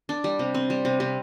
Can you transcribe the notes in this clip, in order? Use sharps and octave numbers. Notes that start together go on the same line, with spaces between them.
D4
G3
C3
C4
G3
C3
C3